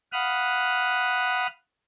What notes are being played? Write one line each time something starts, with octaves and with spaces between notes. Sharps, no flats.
F5 F#5 B5 D#6 F6 F#6